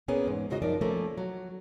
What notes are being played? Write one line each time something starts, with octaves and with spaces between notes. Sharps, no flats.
A#2 A#3 B3 C#4 G#4
E2 G#2
G#2 C#3 F4 F#4 D#5
F#2 F3 D#4 A#4 D5
F3 A3 A#3 C#4
F#3